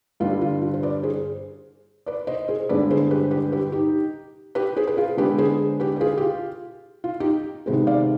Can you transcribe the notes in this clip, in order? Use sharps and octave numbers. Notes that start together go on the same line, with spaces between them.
G2 D3 G3 F4
F4
F4
C5
B4 D5
G#4 C5
B4 D5
C5 D#5
G#4 C5
G2 D3 G#3 B3 B4 D5
G#4 C5
G4 B4
G4 B4
G4 B4
D#4 G4
G4 B4
G#4 C5
B4
F4 G#4
D3 G#3 B3 G4 B4
G#4 C5
G4 B4
B4
F4 G#4
G4
F4
F4
D#4 G4
C3 D#3 G#3 B3 G#4 C5
D5 F5